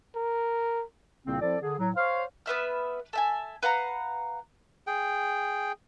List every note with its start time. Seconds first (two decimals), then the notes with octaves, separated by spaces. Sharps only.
0.15 A#4
1.26 C2 A#2 C#3 A#3 C4
1.41 F3 C4 E4 A4 D5
1.61 D3 G#4
1.78 A2 F#3
1.95 C5 C#5 F5
2.46 B3 B4 E5 F6
3.13 A4 E5 G#5
3.63 B4 F5 F#5 A#5
4.87 G#4 G5